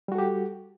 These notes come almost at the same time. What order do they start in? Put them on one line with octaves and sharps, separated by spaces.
G3 F#4 A4 G4